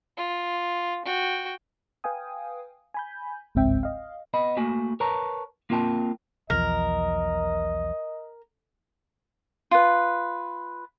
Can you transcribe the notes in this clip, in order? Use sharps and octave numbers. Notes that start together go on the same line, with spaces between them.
F4
F#4 G5
B4 F5 G5 G#5 D#6
G#5 B5 G6
G1 C#2 G#2 C4 E5 G5
D#5 F5
B3 D#5 B5
A3 A#3 F#4 G#5
A#4 B4 C#5 A5 A#5
A#3 C4 F4 A#4 G5 A5
B1 E2 F3 A#4 D#5
F4 B4